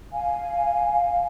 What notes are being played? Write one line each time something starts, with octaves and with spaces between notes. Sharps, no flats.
F5 G#5